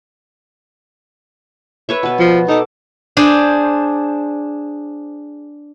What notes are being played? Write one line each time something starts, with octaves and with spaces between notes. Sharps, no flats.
B4 C#5 E5
B2 B4
F3
D#4 A4 D6
D4 G#4 C5